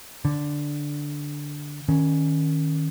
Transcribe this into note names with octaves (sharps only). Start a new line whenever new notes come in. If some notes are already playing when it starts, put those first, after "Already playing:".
D3
D#3 C#4